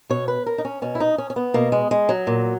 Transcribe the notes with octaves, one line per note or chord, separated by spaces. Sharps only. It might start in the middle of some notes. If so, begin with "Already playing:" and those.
B2 C#5
B4
A#4
D#4
C#4
B2 C#4
E4
D#4
C#4
C#4
B3
B2 A#3
G#3
G#3
F#3
A#2